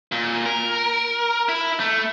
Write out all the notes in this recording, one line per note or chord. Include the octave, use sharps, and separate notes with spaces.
A#2
A#4
E4
A3